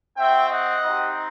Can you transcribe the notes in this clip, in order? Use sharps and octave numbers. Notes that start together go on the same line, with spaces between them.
C4 F#4 E5 G5
D#5 F#5
C4 D#4 G4